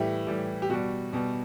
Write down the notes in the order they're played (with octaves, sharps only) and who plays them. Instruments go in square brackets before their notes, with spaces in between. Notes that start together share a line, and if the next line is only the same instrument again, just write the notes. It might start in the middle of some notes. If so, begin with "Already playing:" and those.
Already playing: [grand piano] A2 E3 G3 E4 G4
A2 E3 G3
G4
B2 G3 F#4
B2 G3